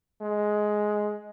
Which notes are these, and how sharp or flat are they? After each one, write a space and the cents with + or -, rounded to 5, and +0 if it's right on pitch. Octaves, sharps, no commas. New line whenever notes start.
G#3 +10